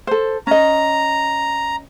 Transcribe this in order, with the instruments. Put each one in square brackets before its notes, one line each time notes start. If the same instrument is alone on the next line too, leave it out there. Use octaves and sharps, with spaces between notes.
[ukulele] A4 C5
[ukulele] C#4 D#5 [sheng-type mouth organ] A#5